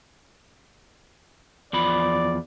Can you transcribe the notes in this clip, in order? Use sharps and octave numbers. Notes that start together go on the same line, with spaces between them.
E2 F3 D5 B5